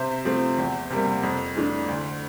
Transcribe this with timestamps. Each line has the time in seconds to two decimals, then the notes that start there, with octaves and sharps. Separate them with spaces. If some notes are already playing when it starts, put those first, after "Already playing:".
Already playing: C3 C5 E5
0.25 F3 A3 C4
0.58 E2
0.90 C3 G3 A#3
1.23 F2
1.56 E3 A3 D4
1.88 D2